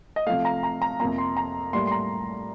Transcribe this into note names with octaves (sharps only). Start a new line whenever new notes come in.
D#5
C3 F3 A3 F5
A#5
A#5
A#5
F2 C3 F3 A#3 A#5
C6
A#5
A2 G3 A#3 C6
C6
A#5